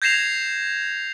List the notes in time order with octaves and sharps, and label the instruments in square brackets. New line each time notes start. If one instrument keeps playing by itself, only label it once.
[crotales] G6 G#6 A#6 C7 E7 F7